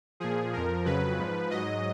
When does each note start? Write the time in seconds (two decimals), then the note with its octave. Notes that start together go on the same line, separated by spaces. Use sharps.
0.20 A#2 F3 G#4
0.53 F2 F3 A#4
0.85 F2 C#3 F#3 B4
1.18 G#2 F3
1.51 G#2 F#3 D#5